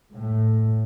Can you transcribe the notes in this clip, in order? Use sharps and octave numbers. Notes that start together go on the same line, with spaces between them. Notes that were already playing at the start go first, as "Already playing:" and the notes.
A2